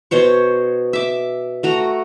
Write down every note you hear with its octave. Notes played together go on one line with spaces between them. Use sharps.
B2 C5 C#5 C#6
E5 D6
A3 F#4 A#5